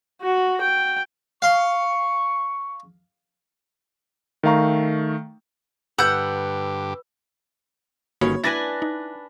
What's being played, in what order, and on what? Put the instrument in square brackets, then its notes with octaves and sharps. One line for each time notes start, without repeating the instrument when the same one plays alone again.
[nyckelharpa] F#4
G5
[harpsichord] F5 C6 [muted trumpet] C#6
[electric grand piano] D#3 A3 F5 A#5 C#6
[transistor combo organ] G2 D3 G4 [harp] B4 [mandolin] F#5 G6 [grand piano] E6
[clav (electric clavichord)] G1 D#3 C#4 [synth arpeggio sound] A#3 F#4 B5 [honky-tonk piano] C#5
[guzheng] D4 B4 G#5 [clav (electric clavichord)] E4 [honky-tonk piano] A6 A#6
[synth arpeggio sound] D#4